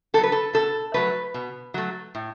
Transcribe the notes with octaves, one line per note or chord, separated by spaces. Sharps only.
F#3 B3 A4
B4
A4
B2 A4
F#3 A3 B4
B2
F#3 A3
A2